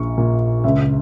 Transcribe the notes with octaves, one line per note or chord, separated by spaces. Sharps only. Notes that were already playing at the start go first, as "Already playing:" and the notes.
Already playing: A#1 A#2 C#6
A#2
C#2 E5